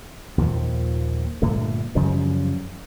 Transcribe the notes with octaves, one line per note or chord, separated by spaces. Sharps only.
D#2 A#2 D#3 F3
G2 A#2 D3 A3
F#2 C#3 F3 G3